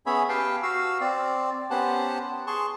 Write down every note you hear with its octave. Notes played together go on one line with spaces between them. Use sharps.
B3 C#4 G#4 C#5 E5 B5
G4 B4 F5 G5 A5
F#4 F5 E6
C4 D5
B3 C#4 G4 C5 F#5 A5
G#4 A5 C6 C#6